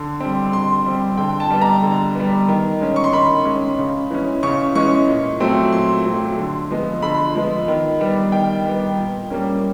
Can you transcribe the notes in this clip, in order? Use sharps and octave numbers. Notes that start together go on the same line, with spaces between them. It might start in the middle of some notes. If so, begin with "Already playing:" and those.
Already playing: D3
G3 C4
D3 C6
G3 C4
D3 G5
A5
G3 B3
A#5
D3
G3 B3
D#3
G#3 C#4
C#6
C6
D#3 B5
G#3 C#4
C#3
E3 G#3 C#4
C#3 C#6
E3 G#3 C#4 C#6
A#2
F#3 A3 C4
A#2 C6
F#3 A3 C4
D3
F3 G#3 B3
D3 B5
F3 G#3 B3
D#3
G3 B3
D#3 G5
G3 B3
A#2
G3 A#3 C#4